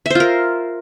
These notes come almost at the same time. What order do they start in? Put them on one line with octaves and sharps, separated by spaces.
E5 C5 F4 A#4